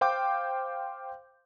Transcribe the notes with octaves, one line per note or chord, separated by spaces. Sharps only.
C5 F5 G5 C6 D6 G6